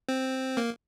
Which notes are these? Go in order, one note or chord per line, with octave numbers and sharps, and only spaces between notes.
C4
A#3